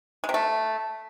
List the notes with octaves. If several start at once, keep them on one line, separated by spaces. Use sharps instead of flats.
G#3
C3
A3